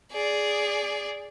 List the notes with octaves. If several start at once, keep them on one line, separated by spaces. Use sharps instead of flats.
G#4 D5